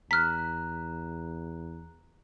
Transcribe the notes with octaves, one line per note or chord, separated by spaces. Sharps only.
E2 A#5 F6 F#6 B6